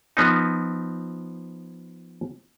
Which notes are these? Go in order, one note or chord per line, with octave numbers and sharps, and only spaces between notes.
F3 B3 C4 D#4